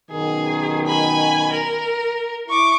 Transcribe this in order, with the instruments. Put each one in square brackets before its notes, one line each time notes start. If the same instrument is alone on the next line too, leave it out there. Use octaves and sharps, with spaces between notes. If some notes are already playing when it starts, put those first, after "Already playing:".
[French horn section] F#2 B2 D#3 [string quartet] G#4
[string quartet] G#5 B5
A#4
[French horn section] E4 [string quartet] C#6 D6